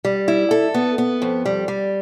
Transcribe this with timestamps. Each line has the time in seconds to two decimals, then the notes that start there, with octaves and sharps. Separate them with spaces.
0.05 G3
0.28 E4
0.51 A4
0.74 B3
0.98 B3
1.22 F2
1.46 G3
1.68 G3